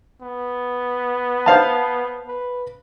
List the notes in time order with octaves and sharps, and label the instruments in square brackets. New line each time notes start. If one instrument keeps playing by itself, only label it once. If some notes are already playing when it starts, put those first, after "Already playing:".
[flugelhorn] B3
[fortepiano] C5 F5 A5
[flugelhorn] B4